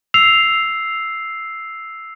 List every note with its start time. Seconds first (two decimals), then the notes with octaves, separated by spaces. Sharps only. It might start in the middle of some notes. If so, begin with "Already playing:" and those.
0.14 E6 C7 F7